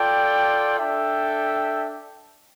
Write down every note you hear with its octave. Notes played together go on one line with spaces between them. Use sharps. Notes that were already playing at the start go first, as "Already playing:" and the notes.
Already playing: F4 A4 D5 G5
D4 A4 E5 G5